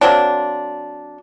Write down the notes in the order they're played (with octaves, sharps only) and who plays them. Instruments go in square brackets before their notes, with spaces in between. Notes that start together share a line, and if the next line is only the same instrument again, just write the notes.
[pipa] F#3 A#3 C4 D4